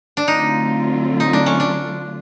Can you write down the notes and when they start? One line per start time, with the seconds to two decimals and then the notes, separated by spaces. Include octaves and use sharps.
0.17 D4
0.28 D3 F#3 A3 C4 D#4 F4
1.20 D#4
1.33 D4
1.46 C#4
1.60 D4